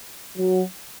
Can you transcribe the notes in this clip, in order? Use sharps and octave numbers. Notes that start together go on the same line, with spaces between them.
F#3